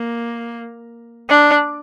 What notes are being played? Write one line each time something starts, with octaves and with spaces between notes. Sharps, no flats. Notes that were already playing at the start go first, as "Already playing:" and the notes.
Already playing: A#3
D4